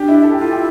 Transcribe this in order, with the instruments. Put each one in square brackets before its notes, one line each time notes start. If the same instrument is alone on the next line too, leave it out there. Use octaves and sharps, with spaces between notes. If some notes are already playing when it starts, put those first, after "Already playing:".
Already playing: [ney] D4 [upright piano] G4
[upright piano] E4
A4
G4
[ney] E4 [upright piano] F4
[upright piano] G4